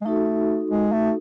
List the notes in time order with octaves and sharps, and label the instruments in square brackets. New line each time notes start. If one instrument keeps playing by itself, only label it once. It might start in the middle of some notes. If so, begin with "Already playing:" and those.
[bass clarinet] G#3
[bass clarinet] A3 [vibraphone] D#4 F#4 A4
[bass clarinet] G#3
A3